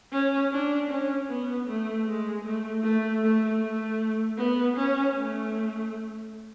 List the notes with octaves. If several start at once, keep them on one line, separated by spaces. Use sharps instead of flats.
C#4
D4
C#4
B3
A3
G#3
A3
A3
A3
A3
B3
C#4
A3